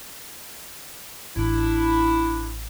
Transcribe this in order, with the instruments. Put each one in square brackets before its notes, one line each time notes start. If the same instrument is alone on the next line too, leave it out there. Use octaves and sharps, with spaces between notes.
[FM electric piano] A1 [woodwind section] D4 E4